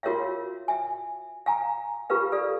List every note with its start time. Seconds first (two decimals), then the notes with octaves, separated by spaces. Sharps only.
0.03 F4 F#4 A#4 C#5 E5 F5
0.68 E5 G#5
1.46 F5 G#5 A#5
2.10 F4 G4 A#4 B4 F5
2.32 A4 B4 D5 F5